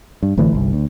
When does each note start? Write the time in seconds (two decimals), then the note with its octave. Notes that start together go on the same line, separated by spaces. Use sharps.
0.23 G2
0.37 G#1 D3 E3 A3
0.52 G1 C2
0.73 D2